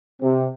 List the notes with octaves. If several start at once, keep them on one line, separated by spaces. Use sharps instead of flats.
C3